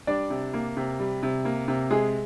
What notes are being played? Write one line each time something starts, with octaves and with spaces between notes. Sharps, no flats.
G3 D4 D5
C3
A#3
C3
G3
C3
A#3
C3
G#3 G#4